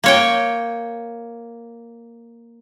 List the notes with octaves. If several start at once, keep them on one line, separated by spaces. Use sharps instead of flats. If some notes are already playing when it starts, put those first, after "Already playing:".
A#3 C#5 G5